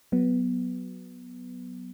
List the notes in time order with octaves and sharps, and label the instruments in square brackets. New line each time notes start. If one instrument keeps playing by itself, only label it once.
[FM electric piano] F#3 B3